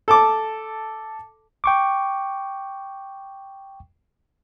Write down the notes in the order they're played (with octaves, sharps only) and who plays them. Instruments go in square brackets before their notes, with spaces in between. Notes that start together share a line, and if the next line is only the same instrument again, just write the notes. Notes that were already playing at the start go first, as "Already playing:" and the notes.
[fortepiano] A4 A5 D6
[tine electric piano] G5 C#6 D6